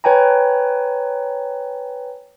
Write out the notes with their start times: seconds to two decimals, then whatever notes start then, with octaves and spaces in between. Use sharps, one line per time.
0.04 B4 C#5 G5 G#5 A#5